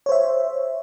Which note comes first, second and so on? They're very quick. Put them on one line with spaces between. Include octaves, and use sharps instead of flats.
C#5 C5 E5